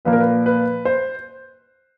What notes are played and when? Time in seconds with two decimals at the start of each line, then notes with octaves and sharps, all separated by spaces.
0.05 A#2 F3 A#3 B4
0.13 A#4
0.20 B4
0.46 B4
0.85 C5